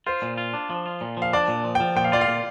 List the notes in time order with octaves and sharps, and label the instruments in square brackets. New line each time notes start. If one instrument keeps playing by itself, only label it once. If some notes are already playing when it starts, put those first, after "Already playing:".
[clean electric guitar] F4 [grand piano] C5
[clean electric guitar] A#2
F4
D4
F3
F4
A#2
[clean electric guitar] F3 [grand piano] F5
[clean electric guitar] D4 [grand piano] D5
[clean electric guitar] A#2
F3
[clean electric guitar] F3 [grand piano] G5
[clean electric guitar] A#2 [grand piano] G5
[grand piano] F5
[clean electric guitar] F4 [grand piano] D5
[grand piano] F5
[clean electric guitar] A#2